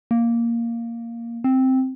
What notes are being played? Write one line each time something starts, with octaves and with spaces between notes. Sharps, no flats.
A#3
C4